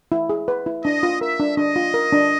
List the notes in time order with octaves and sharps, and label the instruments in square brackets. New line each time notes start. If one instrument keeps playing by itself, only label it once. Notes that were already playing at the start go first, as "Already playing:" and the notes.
[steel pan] E4
G#4
B4
E4
[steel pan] D4 [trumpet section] D#5
[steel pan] F4
[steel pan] A#4 [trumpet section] E5
[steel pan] D4
[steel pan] D4 [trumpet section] D#5
[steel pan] F4
A#4
D4